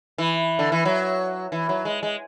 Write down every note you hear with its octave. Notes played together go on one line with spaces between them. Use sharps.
E3
D3
E3
F#3
E3
F#3
G#3
G#3